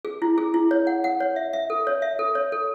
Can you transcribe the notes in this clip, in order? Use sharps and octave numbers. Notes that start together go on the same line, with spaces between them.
G#4
E4
G#4
E4
C#5
F#5
F#5
C#5
E5
E5
A4
C#5
E5
A4
C#5
A4